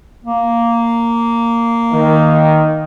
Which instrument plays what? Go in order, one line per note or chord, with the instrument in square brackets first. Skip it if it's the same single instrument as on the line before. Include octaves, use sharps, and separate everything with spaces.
[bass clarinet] A#3
[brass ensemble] D#3